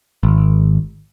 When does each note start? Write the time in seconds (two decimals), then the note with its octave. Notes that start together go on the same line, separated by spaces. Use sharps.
0.23 G#1